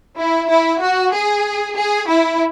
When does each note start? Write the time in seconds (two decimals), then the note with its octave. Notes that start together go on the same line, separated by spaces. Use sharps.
0.17 E4
0.49 E4
0.81 F#4
1.13 G#4
1.76 G#4
2.09 E4